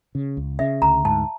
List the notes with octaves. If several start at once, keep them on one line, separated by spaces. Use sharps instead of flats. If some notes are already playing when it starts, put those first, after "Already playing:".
C#3
C#2
C#3 E5
D2 A#5
G#2 A5